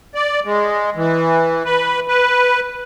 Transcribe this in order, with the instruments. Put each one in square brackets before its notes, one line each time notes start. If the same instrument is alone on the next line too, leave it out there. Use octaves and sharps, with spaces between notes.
[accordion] D5
G#3
E3
B4
B4